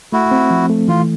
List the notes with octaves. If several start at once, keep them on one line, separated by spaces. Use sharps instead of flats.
A3 E4 F#4
C4
F3
A3
E3 F4